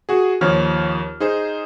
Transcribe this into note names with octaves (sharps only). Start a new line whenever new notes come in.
F#4 G#4
D#2 F3 C#5 F6
D#4 G#4 C5